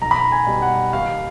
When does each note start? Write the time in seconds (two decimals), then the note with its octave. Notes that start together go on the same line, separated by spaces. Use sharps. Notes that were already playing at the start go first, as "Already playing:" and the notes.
0.02 B1 A#5
0.11 B5
0.20 A#5
0.32 G#5
0.47 B2 G3
0.62 F#5
0.93 D#2 F5